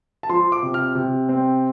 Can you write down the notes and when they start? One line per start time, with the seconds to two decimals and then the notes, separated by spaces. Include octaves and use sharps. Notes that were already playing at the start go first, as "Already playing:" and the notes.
0.23 A5
0.29 F3 C6
0.52 D6
0.63 C3
0.74 F6
0.95 C3
1.29 C4